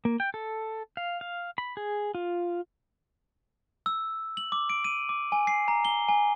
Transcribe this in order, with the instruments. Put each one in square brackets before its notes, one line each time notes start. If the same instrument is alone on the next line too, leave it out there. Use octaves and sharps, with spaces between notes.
[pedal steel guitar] A#3
G5
A4
F5
F5
B5
G#4
F4
[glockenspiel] E6
F#7
D6
D7
D#7
D6
G#5
C7
A#5
G7
G#5